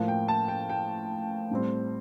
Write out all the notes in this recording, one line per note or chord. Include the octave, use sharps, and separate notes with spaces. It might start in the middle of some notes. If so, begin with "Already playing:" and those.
Already playing: A2 F3 A#3
G5
A5
G5
G5
A2 G3 C4